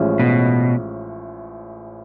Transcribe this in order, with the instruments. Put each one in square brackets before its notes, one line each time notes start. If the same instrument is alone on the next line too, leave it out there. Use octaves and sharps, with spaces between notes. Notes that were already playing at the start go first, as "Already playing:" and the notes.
Already playing: [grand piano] A1 A2 F3 G#3 C#4
[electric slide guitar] B2